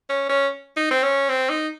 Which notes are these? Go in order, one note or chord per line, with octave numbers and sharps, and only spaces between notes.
C#4
C#4
D#4
C4
C#4
C4
D#4